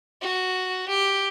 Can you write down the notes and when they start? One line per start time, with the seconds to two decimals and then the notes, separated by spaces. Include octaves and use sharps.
0.22 F#4
0.89 G4